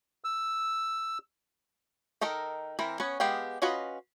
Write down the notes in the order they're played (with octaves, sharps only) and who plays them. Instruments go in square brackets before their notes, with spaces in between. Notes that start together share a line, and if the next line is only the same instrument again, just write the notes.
[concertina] E6
[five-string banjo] D#3 D#4 A4 A#4
E3 C4 A#4 B5
B3 C#4 B4 C#5
G#3 B3 G4 F5 G5
C#4 F4 F#4 B4 D#5